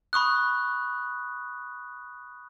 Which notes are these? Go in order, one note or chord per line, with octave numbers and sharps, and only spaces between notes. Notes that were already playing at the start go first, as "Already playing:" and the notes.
B5 C#6 D#6 F#6